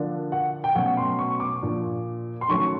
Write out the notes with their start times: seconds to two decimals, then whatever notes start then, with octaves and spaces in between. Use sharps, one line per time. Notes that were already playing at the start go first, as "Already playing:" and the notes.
Already playing: D3 F3 A#3 D4
0.32 F#5
0.64 G5
0.75 B2 F#3 A3 C#4 F#5
0.97 C6
1.19 C#6
1.40 D6
1.62 A#2 F3 A#3 D4
2.41 C6
2.49 D#3 F#3 A3 C#4 C#6